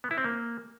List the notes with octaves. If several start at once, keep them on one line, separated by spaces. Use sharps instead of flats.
B3
E4
C4
A#3